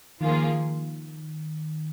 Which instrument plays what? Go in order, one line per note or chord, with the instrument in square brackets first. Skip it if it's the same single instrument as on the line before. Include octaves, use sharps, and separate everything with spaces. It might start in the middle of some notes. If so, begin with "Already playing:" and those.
[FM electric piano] D#3 [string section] F3 A#3 F4 G#4